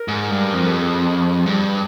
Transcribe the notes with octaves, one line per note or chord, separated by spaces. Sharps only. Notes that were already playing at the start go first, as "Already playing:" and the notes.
Already playing: A#4
G#2
G2
F2
G4
G#4
G2